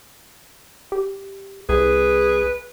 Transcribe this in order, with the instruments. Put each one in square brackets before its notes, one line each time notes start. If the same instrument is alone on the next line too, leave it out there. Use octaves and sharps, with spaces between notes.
[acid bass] G4
[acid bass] C2 [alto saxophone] G#4 [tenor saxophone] B4